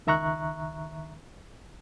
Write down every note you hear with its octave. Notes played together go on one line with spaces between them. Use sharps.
C#2 D#3 E5 A#5 C#6 F#6